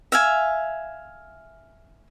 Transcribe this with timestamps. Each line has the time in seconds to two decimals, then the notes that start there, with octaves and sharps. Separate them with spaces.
0.12 E5 F5 G#5